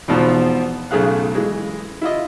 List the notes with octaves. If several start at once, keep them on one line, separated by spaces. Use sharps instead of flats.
E2 G#2 B2 F3
B1 C#3 A3 G#4 F5 F#6
E3 G#3
E4 F4 D#5